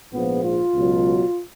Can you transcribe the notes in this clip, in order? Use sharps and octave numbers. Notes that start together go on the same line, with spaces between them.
A#1 G#2 F3 B3
F4
C#2 B2 F#3